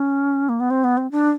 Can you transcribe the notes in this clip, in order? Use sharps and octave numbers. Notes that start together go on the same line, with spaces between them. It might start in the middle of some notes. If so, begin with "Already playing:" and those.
Already playing: C#4
A#3
B3
C4
B3
C4
D4